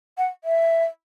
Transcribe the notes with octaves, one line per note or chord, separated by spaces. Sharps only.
F#5
E5